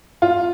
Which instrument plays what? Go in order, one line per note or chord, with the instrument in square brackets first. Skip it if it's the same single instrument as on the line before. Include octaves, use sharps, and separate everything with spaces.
[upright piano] F4